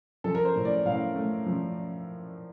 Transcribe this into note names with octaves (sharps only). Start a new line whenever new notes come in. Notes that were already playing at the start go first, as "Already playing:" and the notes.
F3 A4
A#4
C5
A2
D5
A2 F5
A3
F3